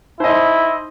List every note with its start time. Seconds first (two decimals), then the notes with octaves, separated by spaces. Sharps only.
0.20 D#4 E4 C5 D#5 C6